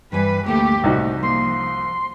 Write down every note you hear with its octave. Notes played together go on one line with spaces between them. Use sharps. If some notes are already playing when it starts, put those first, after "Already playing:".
G2 E3 G3 B4 G#5
D2 A3 A#3 G4
C2 A2 D#4 F#4
F3 A#3 C6